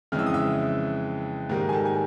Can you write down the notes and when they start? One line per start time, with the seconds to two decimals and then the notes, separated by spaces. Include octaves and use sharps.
0.12 F2 C#3 E3 G#3 F6
0.19 E6
0.26 D#6
0.34 E5 E6
1.49 G#2 D#3 G3 A#3
1.69 G#5
1.72 A4 A5
1.85 G#5